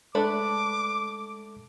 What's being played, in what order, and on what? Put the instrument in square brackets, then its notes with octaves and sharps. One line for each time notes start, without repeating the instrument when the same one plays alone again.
[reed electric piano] G#3 A4 [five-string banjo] A3 D4 B4 [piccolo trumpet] D6